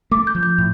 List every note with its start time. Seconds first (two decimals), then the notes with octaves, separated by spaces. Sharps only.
0.11 A3 D6
0.27 G6
0.35 F3
0.43 G6
0.58 A2